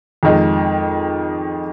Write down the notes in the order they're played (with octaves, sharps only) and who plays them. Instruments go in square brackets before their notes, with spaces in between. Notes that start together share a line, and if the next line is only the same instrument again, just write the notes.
[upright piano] F2 D#3 G#3